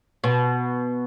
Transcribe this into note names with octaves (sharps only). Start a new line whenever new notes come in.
B2